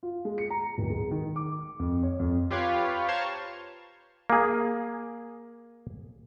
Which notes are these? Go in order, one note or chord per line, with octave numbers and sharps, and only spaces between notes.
F4
G#3
C#7
A#5
D1
G#3
D#3
D6
F2
C#5
F2
F4 G4 B4 C#5 F5
C5 C#5 F5 A5 A#5 C#6
A#3 G#4